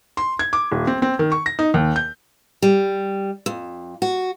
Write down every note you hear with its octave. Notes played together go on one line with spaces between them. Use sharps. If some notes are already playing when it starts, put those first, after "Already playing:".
C6
G#6
D6
D#1
C4
C4
D#3
C#6
A#6
D#4
D#2
G6
G3
F2
F#4